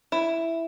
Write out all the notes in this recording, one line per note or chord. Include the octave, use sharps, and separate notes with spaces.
E4